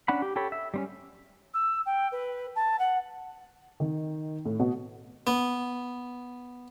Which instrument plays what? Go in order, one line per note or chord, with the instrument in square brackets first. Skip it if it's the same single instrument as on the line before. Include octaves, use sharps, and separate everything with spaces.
[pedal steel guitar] C#4 D4 F#5 B5
G4
G4 A4 C#5 B5
E5
G3 C4 C#4
[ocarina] E6
G5
B4
A5
F#5
[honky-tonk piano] D#3
A2
B2
[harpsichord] B3